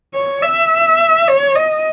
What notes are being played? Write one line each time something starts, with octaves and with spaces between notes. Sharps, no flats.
C#5
E5
C#5
D#5